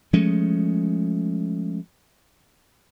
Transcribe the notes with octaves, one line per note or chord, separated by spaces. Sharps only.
F3 G#3 A3 C#4